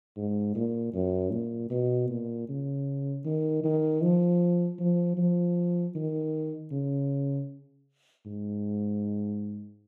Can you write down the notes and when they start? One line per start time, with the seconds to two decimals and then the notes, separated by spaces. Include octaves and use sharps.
0.17 G#2
0.55 A#2
0.93 F#2
1.32 A#2
1.70 B2
2.09 A#2
2.48 C#3
3.25 D#3
3.64 D#3
4.02 F3
4.79 F3
5.17 F3
5.95 D#3
6.71 C#3
8.26 G#2